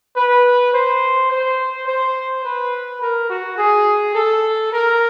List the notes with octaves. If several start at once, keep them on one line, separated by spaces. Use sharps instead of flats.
B4
C5
C5
C5
B4
A#4
F#4
G#4
A4
A#4